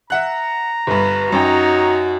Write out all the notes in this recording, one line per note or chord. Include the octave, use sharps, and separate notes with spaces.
E5 F#5 A#5 F#6
G1 G2 B4
F#2 D#4 F#4 C#5 G5